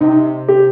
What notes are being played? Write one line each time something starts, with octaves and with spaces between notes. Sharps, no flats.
C3 D#4
G4